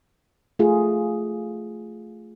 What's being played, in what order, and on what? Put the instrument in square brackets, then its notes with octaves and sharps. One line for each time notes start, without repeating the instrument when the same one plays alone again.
[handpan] A3 F4 G#4